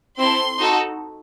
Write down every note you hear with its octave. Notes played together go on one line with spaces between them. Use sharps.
C4 E4 A4 C6
D#4 F#4 A4